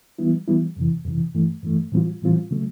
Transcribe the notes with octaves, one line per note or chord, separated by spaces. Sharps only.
E3 G3 B3 E4
E3 G3 B3 E4
F2 C3 E3
F2 C3 E3
G2 E3 A3
G2 E3 A3
A2 E3 G3 C4 F4
A2 E3 G3 C4 F4
C#3 F#3 A3